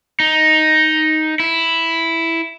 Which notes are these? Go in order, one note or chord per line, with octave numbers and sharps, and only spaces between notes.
D#4
E4